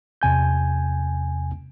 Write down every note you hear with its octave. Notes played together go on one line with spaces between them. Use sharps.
E2 C3 G#5 G6